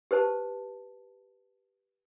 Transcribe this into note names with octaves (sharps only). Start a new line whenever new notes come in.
G4 B4 C5 A5